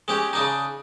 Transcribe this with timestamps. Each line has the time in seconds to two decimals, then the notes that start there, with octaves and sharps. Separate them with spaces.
0.08 G#3 C#4 G4
0.33 C#3 D4 D#4